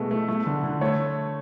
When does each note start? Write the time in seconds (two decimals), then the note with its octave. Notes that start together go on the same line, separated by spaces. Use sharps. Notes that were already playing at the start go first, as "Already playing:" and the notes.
Already playing: B2 G#3 A3
0.11 A3
0.28 A3
0.46 D3
0.64 D3
0.81 A3 C#5